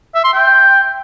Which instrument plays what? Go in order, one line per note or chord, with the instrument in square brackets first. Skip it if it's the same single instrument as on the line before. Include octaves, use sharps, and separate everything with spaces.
[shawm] E5
C6
G5